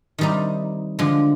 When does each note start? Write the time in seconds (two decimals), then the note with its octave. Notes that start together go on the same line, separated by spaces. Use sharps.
0.18 C3 D#3 G3 D#4
0.99 D3 F3 G#3